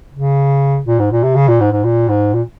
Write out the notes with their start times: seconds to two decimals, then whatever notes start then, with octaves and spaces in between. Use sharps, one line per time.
0.13 C#3
0.87 A#2
0.99 G#2
1.11 A#2
1.23 C3
1.35 C#3
1.48 A#2
1.60 G#2
1.72 G#2
1.84 A#2
2.09 G#2
2.33 A#2